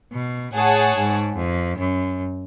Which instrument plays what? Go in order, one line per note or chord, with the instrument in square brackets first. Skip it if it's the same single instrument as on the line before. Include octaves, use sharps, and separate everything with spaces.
[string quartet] B2
[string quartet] A2 [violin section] G#4 C#5 F#5 A5
[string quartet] G#2
F2
F#2